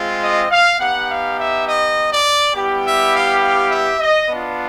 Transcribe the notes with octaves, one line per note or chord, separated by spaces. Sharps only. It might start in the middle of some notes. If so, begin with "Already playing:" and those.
Already playing: G#3 C4 F4
D#5
F5
B3 D#4 G4 F#5
F5
E5
D#5
D5
G3 B3 E4 G4
E5
F5
F5
E5
D#5
B3 D4 F4